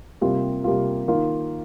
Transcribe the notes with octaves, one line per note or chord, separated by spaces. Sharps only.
C3 G3 A#3 F4
C3 G3 A#3 F4
D#3 A#3 F4